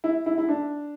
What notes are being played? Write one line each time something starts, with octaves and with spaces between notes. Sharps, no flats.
E4
E4
E4
D4